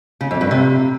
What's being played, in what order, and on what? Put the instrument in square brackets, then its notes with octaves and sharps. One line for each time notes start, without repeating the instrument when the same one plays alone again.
[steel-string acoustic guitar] C#3
F2
G2
C3